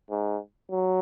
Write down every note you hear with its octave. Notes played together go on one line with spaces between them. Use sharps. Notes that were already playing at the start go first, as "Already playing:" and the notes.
G#2
F#3